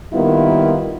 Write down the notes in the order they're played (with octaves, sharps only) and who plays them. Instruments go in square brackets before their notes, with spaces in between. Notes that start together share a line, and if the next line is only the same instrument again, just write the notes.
[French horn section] D#3 G3 A#3 B3 E4 F4